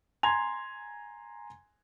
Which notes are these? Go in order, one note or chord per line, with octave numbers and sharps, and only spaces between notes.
G#5 A#5 C6 G#6 F7